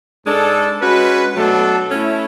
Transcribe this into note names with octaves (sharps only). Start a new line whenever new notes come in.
G#2 G#3 D4 A4
G#3 C#4 F#4 B4
B2 F#3 A3 D4 A4
A3 C#4 E4